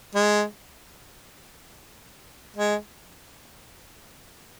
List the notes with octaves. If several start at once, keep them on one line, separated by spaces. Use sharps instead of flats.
G#3
G#3